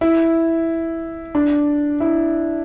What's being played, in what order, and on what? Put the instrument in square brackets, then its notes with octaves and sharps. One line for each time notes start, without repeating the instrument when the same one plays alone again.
[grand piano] E4
D4
E4